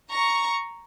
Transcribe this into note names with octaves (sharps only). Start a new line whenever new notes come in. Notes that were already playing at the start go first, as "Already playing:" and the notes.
A#5 C#6